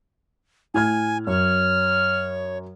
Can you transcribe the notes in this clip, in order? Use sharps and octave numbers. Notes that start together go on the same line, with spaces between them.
A2 G#5 F6 G#6
F#2 C#5 F6